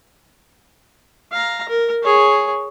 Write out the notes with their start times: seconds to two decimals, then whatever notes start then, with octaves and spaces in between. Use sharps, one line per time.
1.32 F5 A#5
1.69 A#4
2.03 G#4 C#5